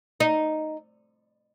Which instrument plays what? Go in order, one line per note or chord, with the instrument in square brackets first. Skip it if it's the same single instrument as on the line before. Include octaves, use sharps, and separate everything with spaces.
[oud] D#4